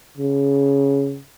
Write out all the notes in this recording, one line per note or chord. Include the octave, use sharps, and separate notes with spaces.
C#3